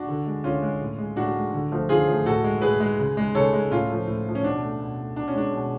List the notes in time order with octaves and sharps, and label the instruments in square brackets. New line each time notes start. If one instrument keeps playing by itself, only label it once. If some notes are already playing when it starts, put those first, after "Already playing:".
Already playing: [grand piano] D4 F#4
D3
G#3
D3 C#4 F4
G#3
A2
G#3
A2 D4 F#4
G#3
D3
F3 A3
D3 F4 G#4
F3 A3
A2 F#4 A4
G#3
A2 G#4 B4
G#3
C#3
G#3
C#3 A4 C#5
G#3
A2 C#4 F4
F3 A3
A2
F3 A3
C#4
B2 D4
A3
B2
A3
B2 D4
C#4
G#3 D4
B2